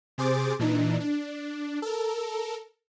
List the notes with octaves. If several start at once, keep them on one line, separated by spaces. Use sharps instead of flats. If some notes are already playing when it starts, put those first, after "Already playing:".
C3 G#4 C5 D6 A6
A#2 E3 D4 D#4
D4
A4 A#4